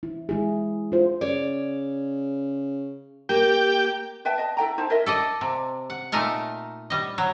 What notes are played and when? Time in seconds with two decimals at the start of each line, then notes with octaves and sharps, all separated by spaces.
0.03 E4
0.29 G#3 E4 G#4
0.92 F4 C5
1.21 C#3 C#5 D5
3.29 A#3 G4 G5
4.25 B4 E5 G5 A5
4.38 D#5 A5
4.57 E4 A4 G5 A#5
4.78 D#4 E4 C5 A5
4.90 E4 A#4 D#5 E5
5.06 A4 D5 D#5
5.41 C3
5.90 F#5
6.12 A#2 A3 D#4 A#4 A5
6.90 G3 D#5
7.18 F#3